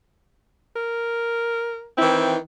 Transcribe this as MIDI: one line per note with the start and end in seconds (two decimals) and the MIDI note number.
0.76 1.87 70
1.98 2.35 51
1.98 2.35 52
1.98 2.35 60
1.98 2.28 64